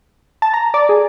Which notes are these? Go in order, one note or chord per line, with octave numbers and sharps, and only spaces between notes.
A5
A#5
D5
G#4